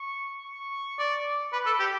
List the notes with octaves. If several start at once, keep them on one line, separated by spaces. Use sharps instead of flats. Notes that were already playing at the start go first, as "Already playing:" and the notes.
Already playing: C#6
C#6
D5
B4 D6
A4
G4